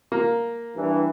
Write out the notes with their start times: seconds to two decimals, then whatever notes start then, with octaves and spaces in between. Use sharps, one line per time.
0.12 A#3
0.76 G2 E3